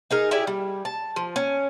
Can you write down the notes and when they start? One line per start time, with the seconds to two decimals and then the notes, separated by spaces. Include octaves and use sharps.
0.11 D#4 G#4 A#4
0.31 E4 G4 G#4 D5
0.47 G3
0.85 A5
1.16 F3
1.36 C#4